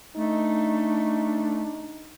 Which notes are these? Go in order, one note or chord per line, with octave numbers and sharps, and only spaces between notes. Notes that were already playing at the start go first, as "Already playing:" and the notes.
A3 D4 D#4